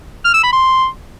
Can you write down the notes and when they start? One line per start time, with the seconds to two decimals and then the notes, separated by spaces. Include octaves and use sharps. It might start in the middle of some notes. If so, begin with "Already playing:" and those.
0.25 F6
0.34 E6
0.43 B5
0.52 C6